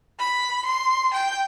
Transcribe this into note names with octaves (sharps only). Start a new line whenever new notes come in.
B5
C6
G5